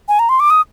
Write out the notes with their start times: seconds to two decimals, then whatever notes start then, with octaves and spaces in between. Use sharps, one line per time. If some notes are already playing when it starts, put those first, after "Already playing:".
0.08 G#5
0.19 A#5
0.29 C6
0.40 D6
0.50 D#6